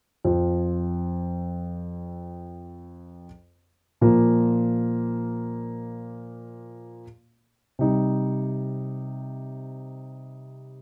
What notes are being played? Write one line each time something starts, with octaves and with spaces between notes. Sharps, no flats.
F2 F3 C4 F4
A#2 F3 A#3 F4
C3 G3 D#4